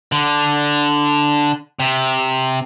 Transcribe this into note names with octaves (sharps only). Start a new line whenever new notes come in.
D3
C3